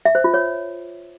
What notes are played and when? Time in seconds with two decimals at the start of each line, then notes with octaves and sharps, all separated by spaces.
0.05 E5
0.15 C5
0.24 F4
0.34 C#5